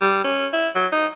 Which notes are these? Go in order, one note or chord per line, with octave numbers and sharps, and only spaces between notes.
G3
C#4
E4
F#3
D#4